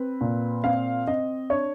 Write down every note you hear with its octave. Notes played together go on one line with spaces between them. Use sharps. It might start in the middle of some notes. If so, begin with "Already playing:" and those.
Already playing: C4 B4
A#2
C4 F5
C4 D#5
D4 C#5